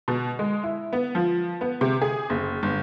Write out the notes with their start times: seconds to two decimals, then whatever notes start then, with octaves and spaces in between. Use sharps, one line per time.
0.08 B2
0.39 G#3
0.63 E4
0.93 B3
1.15 F3
1.61 B3
1.81 C3
2.02 G#4
2.30 F#1
2.63 G1